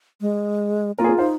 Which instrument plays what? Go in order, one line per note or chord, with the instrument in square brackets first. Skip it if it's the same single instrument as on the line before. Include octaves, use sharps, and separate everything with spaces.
[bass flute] G#3
[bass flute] A#3 [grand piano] F4 A#4
[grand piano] G#4
F4 A#4
[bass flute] D#4 [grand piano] C5 F5